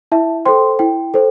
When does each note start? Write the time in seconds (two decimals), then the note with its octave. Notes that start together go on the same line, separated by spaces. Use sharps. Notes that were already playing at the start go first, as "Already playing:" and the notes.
0.12 E4 E5 A5
0.46 A4 C5 G5 C6
0.79 E4 G5
1.14 A4 C5